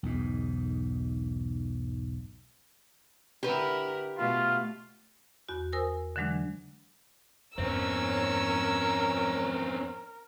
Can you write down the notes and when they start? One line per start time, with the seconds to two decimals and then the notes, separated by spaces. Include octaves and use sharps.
0.03 B1 E2 G#2
3.43 D3 E4 G4 A#4 B4
4.18 B2 A3 F4
5.49 E2 F#4
5.73 A#4 C5 G#5 D#6 E6 A#6
6.16 D3 E3 F#3 G#3 D4
7.58 F2 G#2 C4 C#4 A#4 C#5 E6